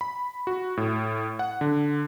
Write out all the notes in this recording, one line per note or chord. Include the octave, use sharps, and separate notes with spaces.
B5
F#4
A2
F#5
D3